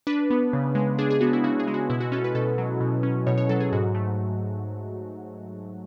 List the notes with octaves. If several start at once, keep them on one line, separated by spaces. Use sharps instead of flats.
D4 B4
B3
C#3
G#3
D4 G#4
G#4
B3 F#4
E4
C#3 F#4
G#4
G#3
F#4
B2 E4
F#4
C#4 A4
B4
B2 A4
F#3
B2
C#4
B2 C#5
C#5
F#3 A4
G#4
G#2 F#4
A3